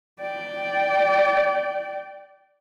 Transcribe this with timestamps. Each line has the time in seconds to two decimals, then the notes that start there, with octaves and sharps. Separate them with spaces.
0.20 D5 G5